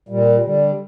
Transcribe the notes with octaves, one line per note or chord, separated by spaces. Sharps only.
A#2 G3
D3 G3